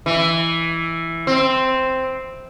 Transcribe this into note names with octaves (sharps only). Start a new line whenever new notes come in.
E3
C4